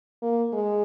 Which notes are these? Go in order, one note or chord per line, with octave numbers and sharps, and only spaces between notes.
A#3
G#3